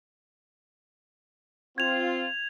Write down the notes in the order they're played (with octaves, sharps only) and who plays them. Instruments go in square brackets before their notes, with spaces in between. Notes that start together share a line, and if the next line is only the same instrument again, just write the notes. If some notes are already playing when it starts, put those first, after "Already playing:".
[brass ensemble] C4 F4 [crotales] G#6 F7